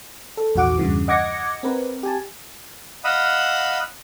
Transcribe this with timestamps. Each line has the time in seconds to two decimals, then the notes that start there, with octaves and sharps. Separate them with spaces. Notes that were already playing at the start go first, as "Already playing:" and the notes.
0.37 A4
0.55 A#1 E2 G#2 F#4 F#5 D6
0.78 E2 G2 C#3 E3
1.08 D#5 F#5 D6 G#6 A#6 C#7
1.63 C4 A#4 B4
2.03 G4 G#5 A5
3.04 D#5 F5 F#5 B5 D#6 E6